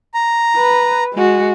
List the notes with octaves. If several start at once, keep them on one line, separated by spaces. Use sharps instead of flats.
A#5
B4
G#3 F#4